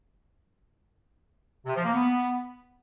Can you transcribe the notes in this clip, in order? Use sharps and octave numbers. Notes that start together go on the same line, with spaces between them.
C3
F3
A#3
B3